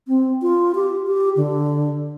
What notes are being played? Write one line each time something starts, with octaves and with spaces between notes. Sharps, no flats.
C4
F4
G4
G4
D3